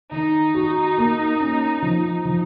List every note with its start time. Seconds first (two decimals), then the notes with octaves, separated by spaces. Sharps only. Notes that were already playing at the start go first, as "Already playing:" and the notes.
0.12 D#3 D#4
0.54 F#4
0.98 A#3
1.40 C#4
1.82 F3
2.25 F3